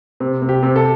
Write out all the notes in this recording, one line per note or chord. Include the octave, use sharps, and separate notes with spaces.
C3
C3
G4
C3
A4